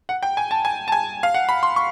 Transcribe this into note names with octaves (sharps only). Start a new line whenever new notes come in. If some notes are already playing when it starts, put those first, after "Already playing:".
F#5
G5
G#5
A5
G#5
A5
G#5
F5
F#5
B5
C6
C#6